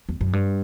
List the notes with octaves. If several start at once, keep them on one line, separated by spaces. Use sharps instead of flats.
E2
F#2
G2